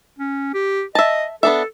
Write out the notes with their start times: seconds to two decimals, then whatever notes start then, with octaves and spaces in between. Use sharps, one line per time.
0.18 C#4
0.54 G4
0.95 D#5 E5 A5
1.43 B3 D4 A4 E5